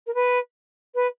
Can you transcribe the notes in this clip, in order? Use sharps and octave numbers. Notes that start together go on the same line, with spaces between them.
A#4
B4
B4